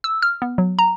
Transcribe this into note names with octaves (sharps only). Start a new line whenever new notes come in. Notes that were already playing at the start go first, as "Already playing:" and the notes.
E6
F6
B3
F#3
A#5